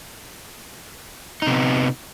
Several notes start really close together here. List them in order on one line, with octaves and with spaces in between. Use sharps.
D#4 C3 B3